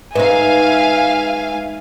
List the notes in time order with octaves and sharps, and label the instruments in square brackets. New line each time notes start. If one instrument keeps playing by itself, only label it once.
[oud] G#2 D#4 [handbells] B4 [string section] E5 F5 [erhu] G#5